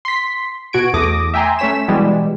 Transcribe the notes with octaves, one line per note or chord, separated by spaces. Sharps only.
C6 B6
B2 F#4 G#6 D7
E2 A3 D6 D#6 A#6
E5 G5 G#5 A#5 C6
A3 C#4 C#5 B6 E7
B2 E3 G3 G#3